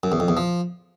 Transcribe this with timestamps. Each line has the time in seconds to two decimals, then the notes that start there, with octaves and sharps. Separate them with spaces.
0.03 F#2
0.12 E2
0.20 F2
0.28 E2
0.37 F3